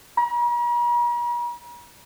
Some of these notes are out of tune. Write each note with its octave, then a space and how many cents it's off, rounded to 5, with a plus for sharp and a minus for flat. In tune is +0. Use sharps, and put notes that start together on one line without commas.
A#5 +45